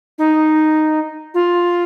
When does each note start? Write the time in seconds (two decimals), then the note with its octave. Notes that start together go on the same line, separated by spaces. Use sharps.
0.18 D#4
1.34 F4